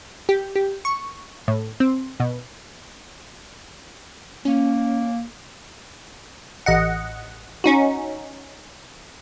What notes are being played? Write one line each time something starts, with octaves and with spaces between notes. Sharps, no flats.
G4
G4
C#6
A2
C4
B2
A#3 C#4
A1 D#5 F#5
C#4 D#4 F#4